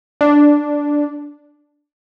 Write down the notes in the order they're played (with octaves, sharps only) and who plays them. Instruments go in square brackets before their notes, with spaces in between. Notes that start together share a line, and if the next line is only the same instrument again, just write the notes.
[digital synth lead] D4